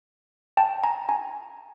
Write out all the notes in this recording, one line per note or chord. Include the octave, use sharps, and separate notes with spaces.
G5 A5
G#5 A#5
G#5 A#5